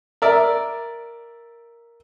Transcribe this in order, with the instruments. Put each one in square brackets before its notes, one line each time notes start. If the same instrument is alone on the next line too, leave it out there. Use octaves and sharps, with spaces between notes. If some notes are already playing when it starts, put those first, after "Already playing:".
[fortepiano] A#4 D5 E5